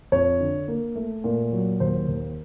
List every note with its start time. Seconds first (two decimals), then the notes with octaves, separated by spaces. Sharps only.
0.12 F2 C#5
0.40 D3
0.68 A#3
0.96 A3
1.24 A#2
1.52 F#3
1.80 D#2 C5
2.08 D#2